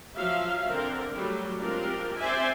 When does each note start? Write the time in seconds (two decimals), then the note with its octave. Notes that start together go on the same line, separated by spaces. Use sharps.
0.15 F3 F#3 E5 F5
0.68 D3 C4 A#4
1.13 F#3 G3 A3
1.60 G#3 C4 D4 F4 G4 A#4
2.18 C4 C5 D5 E5 G#5